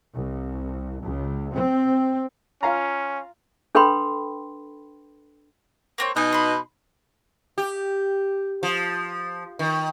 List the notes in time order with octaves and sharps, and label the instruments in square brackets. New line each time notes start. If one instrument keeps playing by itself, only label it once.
[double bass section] C2
C#2
C4
[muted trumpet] C#4 [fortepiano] F4 F5 A#5
[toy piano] D4 A4 B4 G5 B5 C6
[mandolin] A#3 C4 C#5
[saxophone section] B2 D#4 [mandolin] G#5
[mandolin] B5 C6
[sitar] G4
F3
D#3